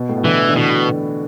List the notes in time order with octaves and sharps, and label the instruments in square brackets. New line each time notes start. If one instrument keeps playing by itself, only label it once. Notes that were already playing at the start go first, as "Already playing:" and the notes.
Already playing: [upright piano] B2
A2
B2
[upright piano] D3 [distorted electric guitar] E3
[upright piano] D3
[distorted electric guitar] B2 [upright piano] E3